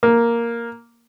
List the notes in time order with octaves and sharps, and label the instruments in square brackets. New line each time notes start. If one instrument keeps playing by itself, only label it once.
[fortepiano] A#3